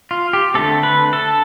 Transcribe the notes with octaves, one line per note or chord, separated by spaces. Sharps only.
F4
G4
D3 A3 C4 A4
B4
A4